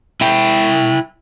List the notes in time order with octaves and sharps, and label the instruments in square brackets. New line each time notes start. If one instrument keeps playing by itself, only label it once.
[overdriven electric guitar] E4 G5